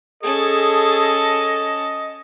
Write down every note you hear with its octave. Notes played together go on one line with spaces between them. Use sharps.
C#4 G#4 A4 D#5 A5